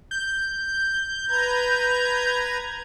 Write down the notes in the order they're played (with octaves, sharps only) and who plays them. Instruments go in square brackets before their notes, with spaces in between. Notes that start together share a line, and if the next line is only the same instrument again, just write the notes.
[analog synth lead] G6
[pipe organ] B4 A#5 G#6